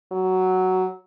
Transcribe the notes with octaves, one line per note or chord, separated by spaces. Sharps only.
F#3